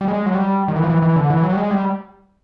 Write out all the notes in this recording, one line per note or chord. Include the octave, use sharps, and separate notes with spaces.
G3
G#3
F#3
G3
D#3
E3
F3
E3
E3
D3
E3
F#3
G3
G#3
G3